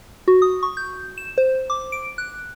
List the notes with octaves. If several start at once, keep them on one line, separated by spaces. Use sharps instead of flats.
F#4
D#6
C#6
G6
E7
C5
D6
D7
F#6